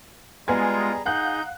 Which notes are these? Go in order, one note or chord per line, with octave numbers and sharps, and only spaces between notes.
G3 G#3 B3 F4 G#4 G#5 A#5 G#6
D#4 G#4 F5 F#5 F#6 G6